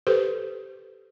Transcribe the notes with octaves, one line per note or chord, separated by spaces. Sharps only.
G4 A4 B4 C5